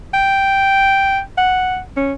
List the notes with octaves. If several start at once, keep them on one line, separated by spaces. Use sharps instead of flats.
G5
F#5
C#4